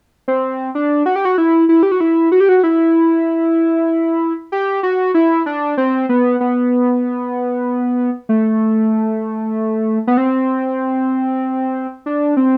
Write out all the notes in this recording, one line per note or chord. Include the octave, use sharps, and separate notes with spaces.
C4
D4
F#4
G4
F#4
E4
E4
G4
F#4
E4
F#4
G4
F#4
E4
G4
F#4
E4
D4
C4
B3
B3
A3
B3
C4
D4
C4